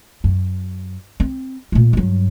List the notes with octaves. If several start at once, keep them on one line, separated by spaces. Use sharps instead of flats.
F#2
C4
A#2 A3
G2 F#3